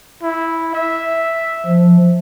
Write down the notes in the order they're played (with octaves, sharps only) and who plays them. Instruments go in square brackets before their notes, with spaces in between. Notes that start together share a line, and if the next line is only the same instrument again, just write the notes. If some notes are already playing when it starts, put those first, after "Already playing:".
[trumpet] E4
E5
[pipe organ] F3